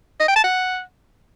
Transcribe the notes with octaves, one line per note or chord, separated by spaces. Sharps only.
D#5
G5
A5
F#5